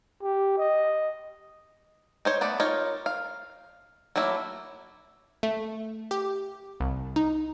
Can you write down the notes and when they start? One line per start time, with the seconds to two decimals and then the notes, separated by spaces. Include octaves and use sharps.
0.23 G4
0.58 D#5
2.25 D#4 C5 C#5
2.41 A3 B3 D5
2.60 D#4 F4 A#4 C#5
3.06 F5
4.16 F#3 A3 A#3 E4
5.43 A3
6.11 G4
6.80 C2
7.16 D#4